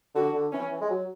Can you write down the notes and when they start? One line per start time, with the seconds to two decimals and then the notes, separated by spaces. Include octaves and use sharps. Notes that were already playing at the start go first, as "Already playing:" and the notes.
0.15 D3 F#4
0.33 D3
0.52 E3 C#4
0.71 E3
0.81 G#3
0.90 F#3